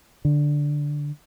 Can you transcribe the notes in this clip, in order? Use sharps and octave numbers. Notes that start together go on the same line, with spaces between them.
D3